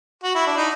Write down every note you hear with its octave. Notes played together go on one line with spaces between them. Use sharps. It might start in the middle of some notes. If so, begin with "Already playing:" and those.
F#4
E4
D4
D#4